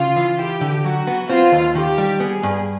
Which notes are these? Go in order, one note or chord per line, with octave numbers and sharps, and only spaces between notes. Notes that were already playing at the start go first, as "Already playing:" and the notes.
Already playing: C#3 F4
E3
E4 G4
D3
F#3 F#4
B3
C4 F4
D#2
D#3 G4
G3
B3 G#4
G2